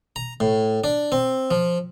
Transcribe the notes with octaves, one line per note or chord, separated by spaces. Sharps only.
A#5
A2
D4
C4
F3